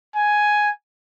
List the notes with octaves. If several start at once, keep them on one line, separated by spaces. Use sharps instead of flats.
G#5